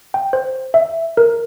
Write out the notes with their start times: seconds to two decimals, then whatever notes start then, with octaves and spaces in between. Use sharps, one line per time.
0.14 G5
0.33 C5
0.74 E5
1.17 A#4